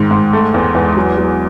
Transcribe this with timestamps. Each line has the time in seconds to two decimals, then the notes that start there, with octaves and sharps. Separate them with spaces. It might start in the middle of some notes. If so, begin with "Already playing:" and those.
Already playing: G#2 D#3
0.11 G#2
0.33 A3
0.54 E2
0.75 E2
0.96 F#3
1.18 F#3